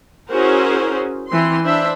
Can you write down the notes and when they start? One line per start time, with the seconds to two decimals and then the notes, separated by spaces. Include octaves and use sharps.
0.30 C#4 E4 F#4 G#4 A#4 C5
1.28 E3 C4 C6
1.63 D4 C5 E5 B5